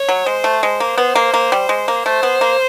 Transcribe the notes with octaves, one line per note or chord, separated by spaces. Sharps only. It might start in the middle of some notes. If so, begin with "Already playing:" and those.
Already playing: C#5
F#3
G#3 C5
A3
G#3 C5
A#3
B3
A#3
A#3
G3
G#3
A#3
A3 C5
B3
A#3